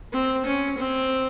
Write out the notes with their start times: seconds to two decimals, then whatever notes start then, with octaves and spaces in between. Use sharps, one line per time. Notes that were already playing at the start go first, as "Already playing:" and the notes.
0.13 C4
0.45 C#4
0.78 C4